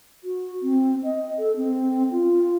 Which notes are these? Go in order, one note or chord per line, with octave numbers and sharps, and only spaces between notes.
F#4
C4
D#5
A4
C4
F4